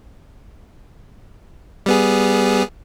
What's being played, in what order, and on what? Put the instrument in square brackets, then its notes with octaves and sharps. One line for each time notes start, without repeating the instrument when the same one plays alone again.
[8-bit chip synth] G3 B3 G#4